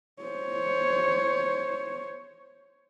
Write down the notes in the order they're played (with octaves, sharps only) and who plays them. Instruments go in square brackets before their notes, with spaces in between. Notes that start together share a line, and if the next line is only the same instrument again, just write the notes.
[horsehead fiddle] C5 C#5